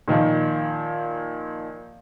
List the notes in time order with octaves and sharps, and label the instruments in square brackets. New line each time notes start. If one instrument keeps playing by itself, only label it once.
[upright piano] A#2 D#3 F3